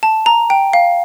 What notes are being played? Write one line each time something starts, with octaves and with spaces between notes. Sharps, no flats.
A5
A#5
G5
F5